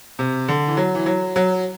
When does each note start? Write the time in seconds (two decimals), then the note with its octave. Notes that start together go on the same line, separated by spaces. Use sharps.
0.19 C3
0.49 D3
0.68 E3
0.77 F#3
0.95 E3
1.06 F#3
1.36 F#3